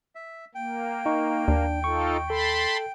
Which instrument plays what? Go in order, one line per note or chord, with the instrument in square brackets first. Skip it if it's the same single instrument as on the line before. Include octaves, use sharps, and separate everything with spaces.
[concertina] E5
[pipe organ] A#3 [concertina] G5
[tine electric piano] D#4 C#6
[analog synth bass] D#2 [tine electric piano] D4
[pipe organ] D#4 F4 A4 [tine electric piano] C#6
[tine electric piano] A4 [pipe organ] A5 B5 C6